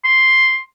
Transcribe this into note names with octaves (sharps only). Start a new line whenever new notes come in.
C6